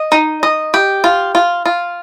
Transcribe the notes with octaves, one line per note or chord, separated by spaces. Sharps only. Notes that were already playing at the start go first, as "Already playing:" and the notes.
Already playing: D#5
D#4
D#5
G4
F4
F4
F4